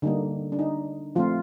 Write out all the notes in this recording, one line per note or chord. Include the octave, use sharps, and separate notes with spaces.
D3 G3 A#3 D#4
D4
D#4
F3 A3 C4 F4